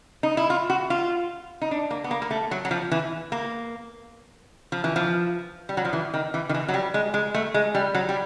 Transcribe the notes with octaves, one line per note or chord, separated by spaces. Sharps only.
D#4
E4
F4
F#4
F4
D#4
D4
A#3
B3
A#3
A#3
A3
F#3
F#3
F3
E3
A#3
F3
E3
F3
G3
F#3
F3
E3
D#3
E3
D#3
E3
F#3
G3
G#3
G#3
A3
G#3
G3
F#3
G3